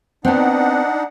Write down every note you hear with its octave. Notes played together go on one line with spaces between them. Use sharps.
B3 C4 D4 D#4 F#5